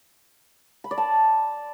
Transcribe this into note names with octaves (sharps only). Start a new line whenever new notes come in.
B5
D5
A5